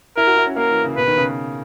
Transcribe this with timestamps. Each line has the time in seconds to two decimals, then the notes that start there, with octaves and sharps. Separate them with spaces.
0.17 E4 A#4
0.27 F#4
0.37 E4
0.47 C#4
0.56 A#3 A#4
0.71 E3
0.84 C#3
0.97 B2 B4
1.07 D#3
1.17 C#3